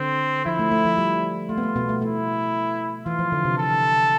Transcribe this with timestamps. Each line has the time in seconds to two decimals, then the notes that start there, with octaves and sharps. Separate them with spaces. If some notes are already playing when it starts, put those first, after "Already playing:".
Already playing: D3 C4
0.46 F3 E4
0.59 A3
0.71 A3
0.85 F3
0.98 G3
1.49 A3 F4
1.58 B3
1.63 A3
1.76 B2 B3
1.89 A3
2.02 A3 E4
3.06 E3 F4
3.19 F3
3.32 D3
3.45 C3
3.58 A4